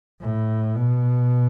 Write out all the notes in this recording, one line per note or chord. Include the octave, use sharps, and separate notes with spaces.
A2
B2